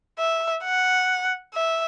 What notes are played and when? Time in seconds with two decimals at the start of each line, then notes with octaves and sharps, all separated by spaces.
0.19 E5
0.64 F#5
1.54 E5